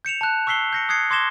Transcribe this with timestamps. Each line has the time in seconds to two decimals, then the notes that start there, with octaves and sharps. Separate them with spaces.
0.05 G6 C#7 E7 F7
0.21 A5 F#6
0.47 C#6 E6 B6 C7 G7
0.73 G6 A#6 C#7
0.89 D#6 F#6 G#6 C7 C#7
1.10 C6 D6 G#6 A#6 E7 G7